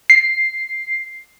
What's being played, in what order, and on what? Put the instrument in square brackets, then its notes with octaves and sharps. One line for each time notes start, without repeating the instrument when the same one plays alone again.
[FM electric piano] C7